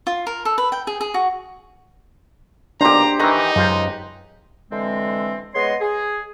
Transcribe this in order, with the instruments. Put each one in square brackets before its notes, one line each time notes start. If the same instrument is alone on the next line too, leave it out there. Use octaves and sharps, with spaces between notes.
[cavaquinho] F4
A#4
A4
B4
G5
G#4
G#4
F#4
[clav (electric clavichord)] B1 A#2 [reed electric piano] D4 [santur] G4 C5 [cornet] A#5
[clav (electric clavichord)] D#3 E3 [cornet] D#4 [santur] B4 A#5
[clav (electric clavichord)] C#2 F4 C5 [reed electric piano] F#2
[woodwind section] D3 E3 G#3 C4
G#3 B3 C#5 D#5 C6
G#4